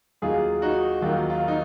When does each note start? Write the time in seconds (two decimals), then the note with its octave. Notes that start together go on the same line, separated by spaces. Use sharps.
0.22 D#2 D#3 F#3 F4 G#4
0.62 D#4 F#4
1.02 D#2 D#3 F#3 F4
1.30 F4
1.48 D#4